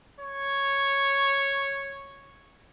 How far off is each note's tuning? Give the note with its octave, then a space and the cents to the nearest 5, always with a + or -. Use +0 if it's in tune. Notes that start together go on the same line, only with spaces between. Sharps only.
C#5 -5